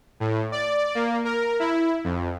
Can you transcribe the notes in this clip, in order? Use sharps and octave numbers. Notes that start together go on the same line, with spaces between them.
A2
D5
A#3
A#4
E4
F2